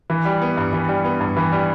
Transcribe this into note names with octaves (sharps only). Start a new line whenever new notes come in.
E3
G3
B3
G2
E3
G3
B3
G2
E3
G3